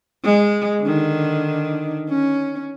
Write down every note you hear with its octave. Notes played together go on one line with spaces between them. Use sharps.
G#3
D3 D#3
C#4